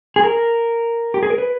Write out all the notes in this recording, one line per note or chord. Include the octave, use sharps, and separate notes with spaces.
G#4
A#4
G4
G#4
A#4
B4